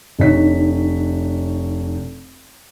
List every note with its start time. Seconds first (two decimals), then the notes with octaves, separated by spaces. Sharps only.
0.19 F1 D4 D#4 C#5 B6